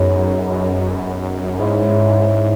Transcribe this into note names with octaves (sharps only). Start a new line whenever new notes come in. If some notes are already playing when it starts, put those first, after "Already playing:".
Already playing: F#2 F#3 B3 D#4 G#4
G#2 G#3 C#4 E4